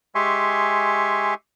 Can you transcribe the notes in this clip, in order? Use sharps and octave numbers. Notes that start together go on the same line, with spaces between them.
G#3 G4 E5 G#5 C6 C#6